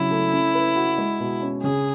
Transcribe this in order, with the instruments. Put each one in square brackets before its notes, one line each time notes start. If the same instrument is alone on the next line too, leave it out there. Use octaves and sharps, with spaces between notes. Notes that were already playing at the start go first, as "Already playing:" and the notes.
Already playing: [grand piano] C#3 F#3 [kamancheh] E4
[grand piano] A3
C#4
B4
F#4
G#3
B2
C#4
[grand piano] C#3 [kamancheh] G#4